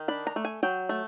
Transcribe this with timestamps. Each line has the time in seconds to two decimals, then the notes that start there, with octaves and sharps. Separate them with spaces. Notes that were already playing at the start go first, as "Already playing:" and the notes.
Already playing: D#3
0.08 D4 B5
0.27 A#5
0.36 A3
0.45 G#5
0.63 F#3 G5
0.89 A3